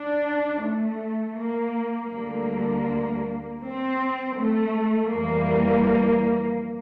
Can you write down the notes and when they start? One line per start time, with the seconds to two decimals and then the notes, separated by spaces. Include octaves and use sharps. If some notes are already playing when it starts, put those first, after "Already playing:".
Already playing: D4
0.61 A3
1.36 A#3
2.11 D2 D3 G3 A#3
3.61 C4
4.37 A3
5.11 F2 E3 G3 A#3